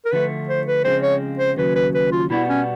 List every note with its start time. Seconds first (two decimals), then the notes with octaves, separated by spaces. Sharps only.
0.05 A#4
0.12 D3 F3 A3 B4
0.49 C5
0.67 B4
0.85 C#3 F3 G#3 C4 C5
1.03 C#5
1.39 C5
1.57 D#2 C#3 F#3 B4
1.76 B4
1.94 B4
2.12 F4
2.30 B2 G3 B3 D4 E4 F#4
2.49 C#4